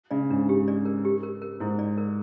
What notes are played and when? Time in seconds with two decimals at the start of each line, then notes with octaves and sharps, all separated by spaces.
0.11 C#3 D5
0.30 G#2 D4
0.49 G4
0.68 D5
0.85 A#4
1.05 G4
1.23 A#4
1.42 A#4
1.60 G#2 E4
1.79 D5
1.98 A#4